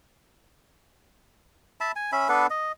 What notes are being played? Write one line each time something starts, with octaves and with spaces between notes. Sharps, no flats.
E5 A5 B5
G#5
C#4 E5 B5
B3 D4 A4 B4
D#5